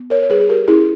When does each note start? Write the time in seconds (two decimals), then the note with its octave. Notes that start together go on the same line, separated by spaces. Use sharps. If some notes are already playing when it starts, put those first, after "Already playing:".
Already playing: B3
0.10 A#4 C#5
0.22 C#5
0.29 G3 G#4 B4
0.40 G#4
0.49 G4 A#4
0.68 C#4 E4 G#4